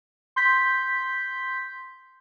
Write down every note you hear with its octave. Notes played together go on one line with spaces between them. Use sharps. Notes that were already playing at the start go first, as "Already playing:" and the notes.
C6 G6 B6